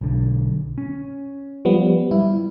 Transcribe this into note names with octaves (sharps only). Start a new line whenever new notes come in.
B1 D3
C#4
F3 G3 B3
G3 E4